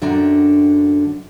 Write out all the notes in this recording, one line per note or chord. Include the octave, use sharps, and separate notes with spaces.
F#2 D3 D4 F#4 G5 A#5